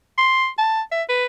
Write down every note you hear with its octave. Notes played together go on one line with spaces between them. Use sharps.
C6
A5
E5
B4